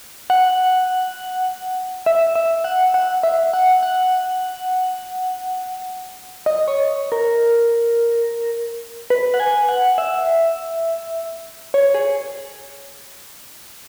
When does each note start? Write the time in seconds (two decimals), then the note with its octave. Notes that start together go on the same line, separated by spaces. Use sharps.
0.30 F#5
2.06 E5
2.36 E5
2.64 F#5
2.94 F#5
3.23 E5
3.54 F#5
3.83 F#5
6.46 D#5
6.68 C#5
7.12 A#4
9.10 B4
9.34 F#5
9.40 G#5
9.69 F#5
9.98 E5
11.74 C#5
11.94 G#4